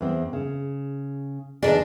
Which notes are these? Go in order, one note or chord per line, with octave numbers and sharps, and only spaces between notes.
E2 C4
C#3
E2 D3 D4 D#4 G#4